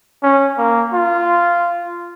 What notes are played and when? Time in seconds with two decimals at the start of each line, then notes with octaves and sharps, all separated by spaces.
0.23 C#4
0.58 A#3
0.94 F4